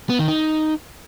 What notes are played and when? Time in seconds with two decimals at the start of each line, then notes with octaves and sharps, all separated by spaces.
0.10 B3
0.19 D#3
0.28 D#4